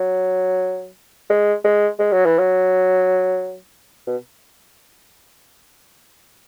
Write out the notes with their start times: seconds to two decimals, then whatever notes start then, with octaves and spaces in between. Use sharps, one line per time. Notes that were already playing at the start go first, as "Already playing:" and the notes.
Already playing: F#3
1.30 G#3
1.64 G#3
1.99 G#3
2.12 F#3
2.25 E3
2.39 F#3
4.07 B2